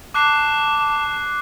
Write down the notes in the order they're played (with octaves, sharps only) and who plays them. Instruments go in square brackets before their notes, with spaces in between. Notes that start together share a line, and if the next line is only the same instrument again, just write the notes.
[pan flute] A5 [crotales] D6 F#6 C7